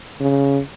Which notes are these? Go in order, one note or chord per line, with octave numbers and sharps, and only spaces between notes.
C#3